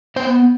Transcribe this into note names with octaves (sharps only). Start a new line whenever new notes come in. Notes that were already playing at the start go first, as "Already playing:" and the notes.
B3 C5